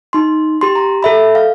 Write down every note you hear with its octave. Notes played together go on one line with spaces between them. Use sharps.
D#4 C6
G4 C6
A#5
A4 E5 B5
F5